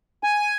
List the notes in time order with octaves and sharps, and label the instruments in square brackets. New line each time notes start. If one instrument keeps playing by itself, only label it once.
[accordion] G#5